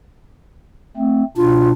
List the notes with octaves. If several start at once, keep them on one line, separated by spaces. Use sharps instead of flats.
A3 C4
B2 D4 F4